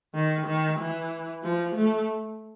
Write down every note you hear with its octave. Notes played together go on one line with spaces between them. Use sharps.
D#3
D#3
E3
F3
A3